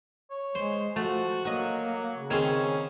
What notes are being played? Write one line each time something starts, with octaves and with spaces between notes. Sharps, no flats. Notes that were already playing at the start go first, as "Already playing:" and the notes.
C#5
G#3 C5
F3 A3 F#4
F#3 A#3 F#4 D#5
C#3
D#3 C4 C#4 G#4 C#5